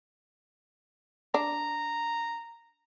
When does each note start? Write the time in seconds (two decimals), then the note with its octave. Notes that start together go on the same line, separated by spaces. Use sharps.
1.34 D4 A#5